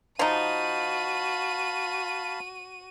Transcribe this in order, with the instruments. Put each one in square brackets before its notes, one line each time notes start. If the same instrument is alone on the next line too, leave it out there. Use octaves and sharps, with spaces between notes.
[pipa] F3 D#4 [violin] F#4 D#7 [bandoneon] F5 A5 B5